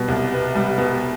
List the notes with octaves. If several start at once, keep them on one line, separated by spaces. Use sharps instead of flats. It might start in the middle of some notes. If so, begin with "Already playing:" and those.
Already playing: B2 G3
C2
B3
G3
B2